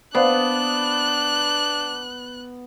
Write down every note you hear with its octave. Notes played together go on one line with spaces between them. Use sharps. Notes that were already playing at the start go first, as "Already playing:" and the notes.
B3 D4 C5 D5 F5 F#6